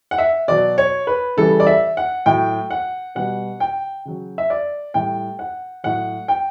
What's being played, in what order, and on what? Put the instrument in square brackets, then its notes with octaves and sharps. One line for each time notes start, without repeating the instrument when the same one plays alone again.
[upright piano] F#5
E5
B2 F#3 D5
C#5
B4
C#3 E3 G3 A4
D5
E5
F#5
A2 F#3 G5
F#5
B2 G3 F#5
G5
C#3 F#3
E5
D5
A2 G3 G5
F#5
A2 F#3 F#5
G5